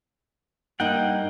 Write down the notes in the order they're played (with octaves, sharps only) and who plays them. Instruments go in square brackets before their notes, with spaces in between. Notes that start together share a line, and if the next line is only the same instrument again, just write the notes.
[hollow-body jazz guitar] G2 A#3 D#4 [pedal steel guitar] F#5 G5